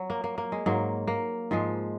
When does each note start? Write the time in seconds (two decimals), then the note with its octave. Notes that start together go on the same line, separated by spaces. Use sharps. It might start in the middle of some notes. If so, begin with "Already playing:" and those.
Already playing: F#3
0.10 A#3
0.24 A#3
0.38 A#3
0.52 G#3
0.66 G#2 F#3 A#3
1.07 A#3
1.51 G#2 F3 G#3